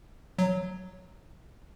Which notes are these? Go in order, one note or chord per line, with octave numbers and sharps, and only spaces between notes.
F#3